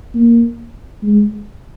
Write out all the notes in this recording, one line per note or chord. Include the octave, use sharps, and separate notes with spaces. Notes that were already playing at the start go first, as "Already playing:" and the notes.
A#3
G#3